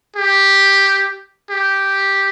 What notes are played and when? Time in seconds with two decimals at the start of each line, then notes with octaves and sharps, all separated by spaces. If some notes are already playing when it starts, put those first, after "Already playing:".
0.16 G4
1.50 G4